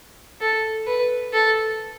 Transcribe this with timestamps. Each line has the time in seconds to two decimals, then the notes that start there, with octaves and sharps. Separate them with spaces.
0.41 A4
0.87 B4
1.34 A4